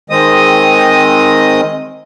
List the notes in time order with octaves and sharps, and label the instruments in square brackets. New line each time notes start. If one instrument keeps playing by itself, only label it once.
[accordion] D#3 G#3 C4 D#5 D#6